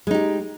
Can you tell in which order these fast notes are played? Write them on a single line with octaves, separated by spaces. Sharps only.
G#3 D#4 G4